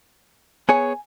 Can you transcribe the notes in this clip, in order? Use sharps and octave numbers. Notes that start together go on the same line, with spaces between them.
B3 G#4 C#5 G#5